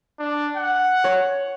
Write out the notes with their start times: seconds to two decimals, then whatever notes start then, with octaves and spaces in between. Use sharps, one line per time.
0.19 D4
0.56 F#5
1.04 C#5